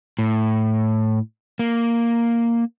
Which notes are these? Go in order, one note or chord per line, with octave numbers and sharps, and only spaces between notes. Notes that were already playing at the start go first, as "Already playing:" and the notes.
A2
A#3